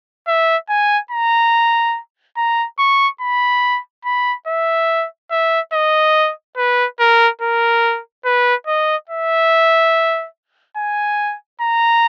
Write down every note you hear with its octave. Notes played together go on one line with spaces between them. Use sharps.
E5
G#5
A#5
A#5
C#6
B5
B5
E5
E5
D#5
B4
A#4
A#4
B4
D#5
E5
G#5
A#5